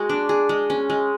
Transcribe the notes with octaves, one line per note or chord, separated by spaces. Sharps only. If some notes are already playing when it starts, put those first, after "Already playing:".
Already playing: G#3 F#4
D4
G#4
G#3
C#4
G#3